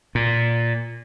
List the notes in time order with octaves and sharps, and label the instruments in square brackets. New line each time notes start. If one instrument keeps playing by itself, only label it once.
[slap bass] A#2